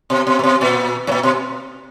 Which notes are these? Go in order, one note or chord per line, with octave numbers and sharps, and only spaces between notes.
B2
B2
A#2
B2
A#2
G#2
A#2
B2